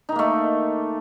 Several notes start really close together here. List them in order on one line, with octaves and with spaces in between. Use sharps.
D#4 D#3 A#3 A3